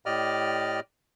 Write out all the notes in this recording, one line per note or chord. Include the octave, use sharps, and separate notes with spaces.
A2 G4 D5 D#5 F6